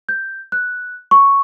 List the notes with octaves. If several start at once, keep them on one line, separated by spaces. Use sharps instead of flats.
G6
F#6
C#6